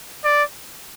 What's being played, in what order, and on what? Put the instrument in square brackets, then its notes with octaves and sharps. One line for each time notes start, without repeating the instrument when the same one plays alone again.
[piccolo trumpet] D5